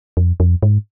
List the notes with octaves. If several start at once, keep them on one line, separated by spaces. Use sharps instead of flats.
F2
F2
G#2